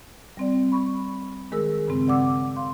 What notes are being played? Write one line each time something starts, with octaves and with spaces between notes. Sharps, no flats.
G3 C4 D5
B5 C#6
D#3 G#3 G#4 A#4 E6
G2 C#3 G#3 C4
D5 F#5 D6 E6
F5 C6